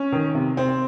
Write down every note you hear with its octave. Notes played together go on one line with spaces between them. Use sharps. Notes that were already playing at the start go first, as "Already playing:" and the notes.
Already playing: C#4
D#3
C3
C4